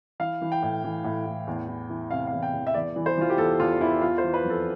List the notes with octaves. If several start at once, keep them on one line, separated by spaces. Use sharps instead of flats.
E3 F5
E3
G5
A2
E3
A2
A2
E2
E3
E3
C3 F5
E2 F5
G5
E2
E5
E2 D5
E3
C5
E3 F4
G4
E2 A4
E2 F4
E2 E4
E3 F4
C5
E3
B4
F2
A4